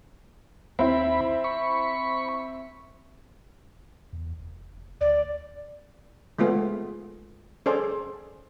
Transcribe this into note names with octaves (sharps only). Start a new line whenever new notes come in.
D#2 C4 E4 B5
B5 C#6
E2
F1
D2 D5
G#3 A3 B3 F4 G#4
C#4 G#4 A4 C5 D5